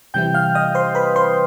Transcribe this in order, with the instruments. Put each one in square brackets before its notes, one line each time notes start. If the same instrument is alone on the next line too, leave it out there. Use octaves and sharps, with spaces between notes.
[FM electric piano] C3 E3 G3 C4 E4 G5 G6
F5 F6
D#5 D#6
C5 C6
B4 B5
C5 C6